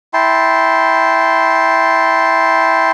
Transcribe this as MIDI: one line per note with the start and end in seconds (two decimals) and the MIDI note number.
0.14 2.92 64
0.14 2.92 79
0.14 2.92 81
0.14 2.92 84